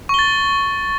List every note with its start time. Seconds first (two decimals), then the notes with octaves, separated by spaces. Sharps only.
0.09 C#6
0.14 G7
0.19 A6